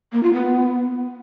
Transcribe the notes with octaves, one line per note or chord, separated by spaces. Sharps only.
A#3
F4
B3